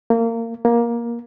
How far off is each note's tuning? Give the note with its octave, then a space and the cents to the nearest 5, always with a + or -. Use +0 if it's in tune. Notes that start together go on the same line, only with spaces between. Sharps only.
A#3 -25
A#3 +15